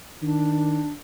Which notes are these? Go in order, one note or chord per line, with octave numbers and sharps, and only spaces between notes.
D#3 D4